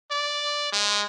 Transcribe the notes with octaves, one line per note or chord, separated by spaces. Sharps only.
D5
G#3